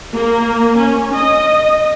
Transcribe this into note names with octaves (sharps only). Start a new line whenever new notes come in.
A#3
C#4
D#5